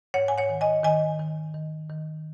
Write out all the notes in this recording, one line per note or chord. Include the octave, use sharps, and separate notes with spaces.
G#2 C#5 F#5
G#5
C#5 F#5
D#3
D#5 G#5
D#3 D#5 G#5
D#3
D#3
D#3